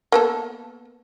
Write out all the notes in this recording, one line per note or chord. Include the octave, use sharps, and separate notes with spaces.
A#3 B3 A4